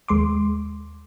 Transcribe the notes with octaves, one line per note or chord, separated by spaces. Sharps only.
D#2 G#3 C6 D6